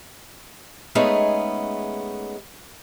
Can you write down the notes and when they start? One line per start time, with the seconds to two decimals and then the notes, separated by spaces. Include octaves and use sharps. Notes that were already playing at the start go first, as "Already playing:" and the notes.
0.95 G#3 A3 B3 C#4 D#4 G#4